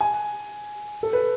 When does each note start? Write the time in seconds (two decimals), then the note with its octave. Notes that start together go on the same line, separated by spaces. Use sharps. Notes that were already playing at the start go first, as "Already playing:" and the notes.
0.01 G#5
1.03 A4
1.13 B4